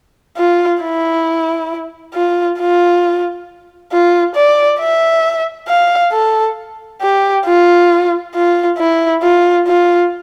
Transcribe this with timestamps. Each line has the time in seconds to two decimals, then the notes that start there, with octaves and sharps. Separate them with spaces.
0.37 F4
0.82 E4
2.14 F4
2.59 F4
3.92 F4
4.35 D5
4.80 E5
5.68 F5
6.12 A4
7.02 G4
7.46 F4
8.35 F4
8.79 E4
9.23 F4
9.68 F4